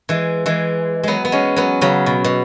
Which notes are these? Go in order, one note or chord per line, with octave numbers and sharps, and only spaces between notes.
E3 G#3
E3 G#3
F#3 G#3 B3
B3
G#3 C#4
F#3 B3
C#3 F#3
B2
B2